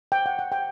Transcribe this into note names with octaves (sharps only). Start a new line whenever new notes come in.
G5
F#5
F#5
G5